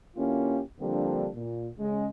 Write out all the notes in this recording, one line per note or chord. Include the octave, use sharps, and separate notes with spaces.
D3 A#3 C#4 E4 F4 G4
D3 F3 G3 A#3 C4 D4
A#2
C#3 G#3